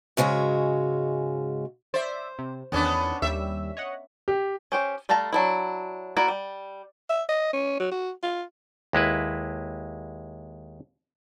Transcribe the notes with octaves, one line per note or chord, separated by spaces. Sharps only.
G#2 C#3 G#3 C#4 F#4
C5 D5 E5
C3
E2 D#3 B3 C#4 D4
D#2 G3 E5 E6
C#5 D#5 F#5
G4
C#4 G4 C5
G3 A3 F5 A5 A#5
F#3 D4 E4
A#3 E4 F#4 D5
G3
E5
D#5
C#4
F#3
F#4
F4
D#2 G#3 E4 B4